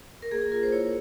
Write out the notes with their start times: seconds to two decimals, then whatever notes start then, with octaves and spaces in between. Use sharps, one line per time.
0.22 A#4
0.31 A#3 G#4
0.42 G#4
0.52 F4 A#4
0.63 C5
0.72 E4 C#5